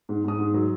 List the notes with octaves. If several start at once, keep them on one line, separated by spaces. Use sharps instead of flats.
G#2
G#2 D#6
G#2
F#3